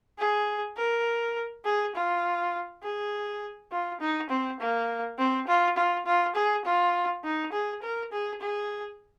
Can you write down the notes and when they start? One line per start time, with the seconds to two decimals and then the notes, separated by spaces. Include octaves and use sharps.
0.18 G#4
0.77 A#4
1.65 G#4
1.95 F4
2.83 G#4
3.71 F4
4.00 D#4
4.29 C4
4.60 A#3
5.18 C4
5.47 F4
5.76 F4
6.06 F4
6.35 G#4
6.65 F4
7.24 D#4
7.52 G#4
7.82 A#4
8.12 G#4
8.41 G#4